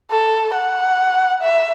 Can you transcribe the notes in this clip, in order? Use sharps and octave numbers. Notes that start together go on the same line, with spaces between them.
A4
F#5
E5